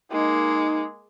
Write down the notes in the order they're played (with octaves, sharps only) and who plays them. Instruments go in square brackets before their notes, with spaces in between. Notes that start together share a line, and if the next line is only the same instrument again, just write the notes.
[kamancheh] G#3 A#3 [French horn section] D#4